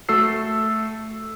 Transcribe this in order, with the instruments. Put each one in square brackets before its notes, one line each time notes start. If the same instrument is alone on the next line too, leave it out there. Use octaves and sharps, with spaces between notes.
[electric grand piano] A3 F#4 A4 E6 C7